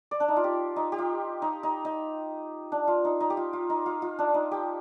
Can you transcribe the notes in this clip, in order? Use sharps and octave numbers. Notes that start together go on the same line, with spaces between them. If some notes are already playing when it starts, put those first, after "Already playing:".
D5
D4
D#4
F4
G4
D#4
G4
F4
D#4
D#4
D#4
D4
F4
D#4
D#4
G4
F4
F4
D#4
F4
F4
D4
D#4
G4